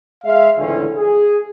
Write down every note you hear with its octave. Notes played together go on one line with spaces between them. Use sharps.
G#3 E5 F5
C#2 A2 D3 E3 C4 C#4
G#4